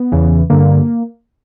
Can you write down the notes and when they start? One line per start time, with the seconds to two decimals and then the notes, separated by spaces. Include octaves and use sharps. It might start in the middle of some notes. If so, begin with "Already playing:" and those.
Already playing: B3
0.12 E2 C#3 E3
0.50 G2 D3 A#3